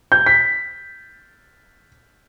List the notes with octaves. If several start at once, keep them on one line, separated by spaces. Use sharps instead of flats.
G6
B6